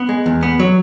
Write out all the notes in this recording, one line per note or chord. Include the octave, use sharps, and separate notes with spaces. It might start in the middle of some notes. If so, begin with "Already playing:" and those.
Already playing: B3
G#3
E2
B3
F#3